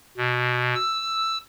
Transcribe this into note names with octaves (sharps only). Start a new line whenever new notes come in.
B2
E6